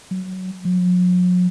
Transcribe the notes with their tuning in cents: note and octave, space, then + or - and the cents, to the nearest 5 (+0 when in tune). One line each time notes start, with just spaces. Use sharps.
F#3 +10
F#3 -45